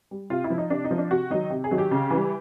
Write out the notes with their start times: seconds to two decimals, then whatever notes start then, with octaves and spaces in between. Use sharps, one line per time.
0.11 G3
0.30 C3 F4
0.44 E4
0.50 F3
0.58 D#4
0.70 C3 D4
0.84 D#4
0.91 F3
0.98 D4
1.10 C3 F#4
1.30 D#3 F#3 D#4
1.50 C3
1.64 G#4
1.71 D#3 F#3
1.78 G4
1.91 C#3
2.11 E3
2.16 G3